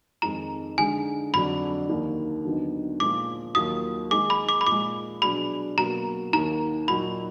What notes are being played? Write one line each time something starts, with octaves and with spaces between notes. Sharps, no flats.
F2 D#3 G#3 D#4 G#4 A#5
D3 G#3 D#4 G#4 G#5
F2 D3 F#3 D4 B5
D#2 D#3 A#3
D#2 D3 F#3 B3 D#4
A#2 F3 G#3 D6
D#2 D#3 F#3 A#3 F4 D#6
D#3 G#3 D#4 G#4 D6
B5
D6
B5
A#2 F3 G#3 D6
B2 F#3 D4 G#4 B5
B2 F#3 A#3 A#5
D#2 D#3 A#3 A#5
A#2 F#3 A#3 D#4 F#4 B5